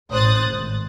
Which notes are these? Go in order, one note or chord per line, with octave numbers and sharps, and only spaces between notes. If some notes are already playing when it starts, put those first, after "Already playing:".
A1 C5 D#6 F#6 A6
G#1